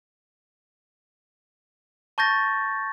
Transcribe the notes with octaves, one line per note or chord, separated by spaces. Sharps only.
A5 C#6 G6 A6 A#6